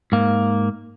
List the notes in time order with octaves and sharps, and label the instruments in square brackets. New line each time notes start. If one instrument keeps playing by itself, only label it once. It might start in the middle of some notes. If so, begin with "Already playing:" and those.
[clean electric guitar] G#2 A#3